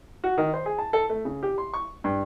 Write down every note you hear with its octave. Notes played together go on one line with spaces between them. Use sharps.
F#4
D#3
C5
G#4
A5
A4
A3
C#3
G4
C6
C#6
G2